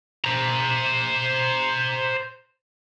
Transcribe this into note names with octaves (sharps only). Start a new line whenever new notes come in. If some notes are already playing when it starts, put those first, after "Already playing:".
C5 A#5